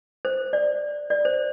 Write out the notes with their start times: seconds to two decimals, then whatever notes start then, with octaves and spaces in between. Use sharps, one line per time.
0.25 C5
0.53 D5
1.10 D5
1.25 C5